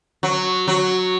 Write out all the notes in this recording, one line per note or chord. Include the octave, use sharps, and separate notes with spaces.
F#3
F#3